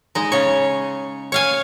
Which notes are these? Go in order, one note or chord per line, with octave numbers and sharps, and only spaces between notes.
G#3 D#4
C#3 C#5
C#5 F5 G#5